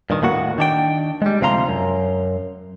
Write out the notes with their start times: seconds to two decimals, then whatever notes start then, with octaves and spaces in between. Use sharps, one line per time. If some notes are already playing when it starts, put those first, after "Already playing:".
0.10 G2 A#2 D#3
0.22 D#2 A2 A#3 F#4 F#5
0.58 D#3 D4 G5
1.22 G3 G#3
1.41 D2 C3 F3 F5 A#5 C6
1.68 F#2